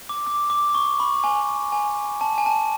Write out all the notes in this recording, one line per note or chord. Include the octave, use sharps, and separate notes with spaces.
D6
D6
D6
C#6
B5
G#5
G#5
A5
G#5
A5